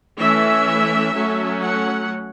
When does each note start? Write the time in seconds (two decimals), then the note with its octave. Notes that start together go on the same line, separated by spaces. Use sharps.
0.19 E3 A3 C#4 E5
1.14 F#3 A3 C#4
1.62 F#5